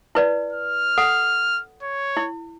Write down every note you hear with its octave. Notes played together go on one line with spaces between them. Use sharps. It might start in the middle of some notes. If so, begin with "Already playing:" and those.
E4 B4 D5
F6
A4 F#5
C#5
E4